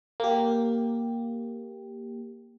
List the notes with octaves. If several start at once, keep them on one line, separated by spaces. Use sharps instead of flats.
A#3 G4